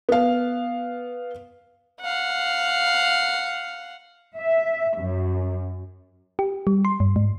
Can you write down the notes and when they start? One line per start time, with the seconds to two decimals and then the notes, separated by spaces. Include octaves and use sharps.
0.09 B3 F5
2.01 F5 F#5
4.37 E5
4.98 F#2
6.39 G4
6.67 G3
6.85 C6
7.00 G2
7.16 G#2